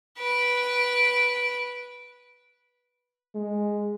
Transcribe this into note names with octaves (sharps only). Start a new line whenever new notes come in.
B4 D7
G#3